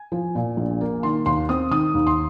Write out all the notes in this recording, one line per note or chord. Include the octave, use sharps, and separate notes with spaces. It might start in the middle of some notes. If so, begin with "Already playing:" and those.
Already playing: G#5
F3
A#2
A#1
A#3
D#3 C6
D#2 C6
C4 D#6
D#3 D#6
D#2
C6